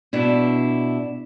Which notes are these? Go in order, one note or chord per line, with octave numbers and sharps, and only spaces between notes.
B2 D4 E4